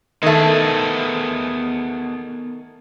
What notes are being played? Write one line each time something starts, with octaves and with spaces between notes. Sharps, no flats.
D#3 A3 B3 G#4 D#5